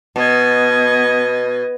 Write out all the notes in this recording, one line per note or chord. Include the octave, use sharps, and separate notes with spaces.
B2 B3 D#5 G#6